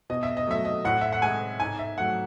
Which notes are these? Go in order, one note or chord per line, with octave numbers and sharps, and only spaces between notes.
B2 D#5
E5
D#5
F#3 A3 E5
D#5
A2 F#5
E5
F#5
G#3 G#5
G#2 G#5
E5
F#3 A3 F#5